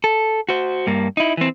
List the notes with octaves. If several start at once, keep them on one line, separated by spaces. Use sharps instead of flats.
A4
F#4 C5
G2 A#3
D#4 E4
E3 C4